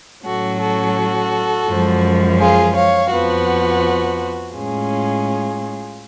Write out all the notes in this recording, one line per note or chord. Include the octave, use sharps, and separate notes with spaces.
A2 F#3 C#4 F#4 A4
F#4 A4
F#2 F3 G#3
F4 G#4
C#5 F5
F2 F3 B3 F#4
A2 G#3 C#4 F4 G#4